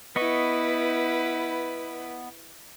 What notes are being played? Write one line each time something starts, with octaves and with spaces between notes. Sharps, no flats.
B3 E4 B4 D#5 C#6